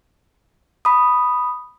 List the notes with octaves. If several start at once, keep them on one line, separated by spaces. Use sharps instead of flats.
B5 D#6